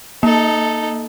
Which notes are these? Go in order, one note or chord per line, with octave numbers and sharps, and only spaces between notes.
A#3 D#4 A4